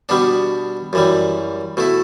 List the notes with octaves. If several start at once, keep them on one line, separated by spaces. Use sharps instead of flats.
B2 G3 B3 D4
F#2 E3 G3
B2 A3 E4